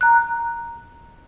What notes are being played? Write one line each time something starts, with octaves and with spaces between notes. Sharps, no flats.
A#5 F#6